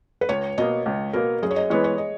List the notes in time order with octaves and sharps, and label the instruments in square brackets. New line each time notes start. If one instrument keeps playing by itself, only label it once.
[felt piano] B4
[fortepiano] C#2 [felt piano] C#5
[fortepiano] B2 A#3 [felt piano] D#5
[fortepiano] C#2
[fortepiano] B2 A#3 [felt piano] A#4
[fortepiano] F#2 [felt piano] G#4
[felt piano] C#5
D#5
[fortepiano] E3 G#3 B3 [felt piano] C#5
[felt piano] C#5
D#5